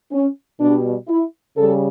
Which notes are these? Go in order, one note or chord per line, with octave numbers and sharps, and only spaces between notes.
C#4
B2 G3 D4
E4
C#3 G3 A4